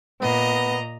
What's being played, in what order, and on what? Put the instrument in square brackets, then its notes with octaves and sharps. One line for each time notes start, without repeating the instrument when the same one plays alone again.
[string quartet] A#2 D#5 A#5 [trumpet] B3